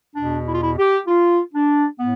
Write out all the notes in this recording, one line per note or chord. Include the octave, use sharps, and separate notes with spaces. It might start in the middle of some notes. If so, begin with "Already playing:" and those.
E2 B2 D4
E4
F4
E4
G4
F4
D4
A2 B3